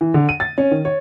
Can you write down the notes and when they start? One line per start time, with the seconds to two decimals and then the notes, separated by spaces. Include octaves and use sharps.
0.01 E3
0.14 D3
0.29 D#7
0.40 A6
0.58 C#4
0.71 D#3
0.85 C#5